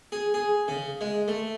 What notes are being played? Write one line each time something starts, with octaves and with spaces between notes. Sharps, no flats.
G#4
G#4
C#3
G#3
A3